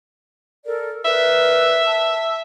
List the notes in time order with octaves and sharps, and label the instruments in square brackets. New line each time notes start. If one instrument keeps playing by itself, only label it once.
[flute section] A4 A#4 D5
[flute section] A#4 B4 D5 [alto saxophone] E5
[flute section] A5